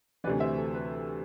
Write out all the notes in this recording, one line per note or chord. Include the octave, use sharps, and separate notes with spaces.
D2 C3 E3 B4 D5
C5 E5
A4
B4